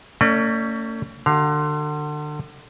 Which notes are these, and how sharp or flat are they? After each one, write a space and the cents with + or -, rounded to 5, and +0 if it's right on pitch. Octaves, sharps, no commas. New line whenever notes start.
A3 +45 C#4 +20 D5 +45
D3 +30 F#4 +35 F5 +0